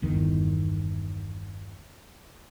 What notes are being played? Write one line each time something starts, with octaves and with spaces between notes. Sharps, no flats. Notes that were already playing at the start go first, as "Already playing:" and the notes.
G1 E2 D#3